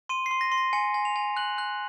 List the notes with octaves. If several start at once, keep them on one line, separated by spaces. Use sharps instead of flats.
C6 D#7
C7
C6
A#6
C6
A#6
G#5 C#7
G#5
F7
G#5
F#6 F#7
F#6